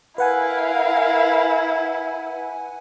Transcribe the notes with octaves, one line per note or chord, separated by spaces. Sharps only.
E4 A#4 B4 F5 F#5 G#5